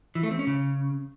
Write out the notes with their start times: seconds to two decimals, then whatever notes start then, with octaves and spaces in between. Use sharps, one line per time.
0.15 E3
0.23 A3
0.31 C4
0.39 C#4
0.47 C#3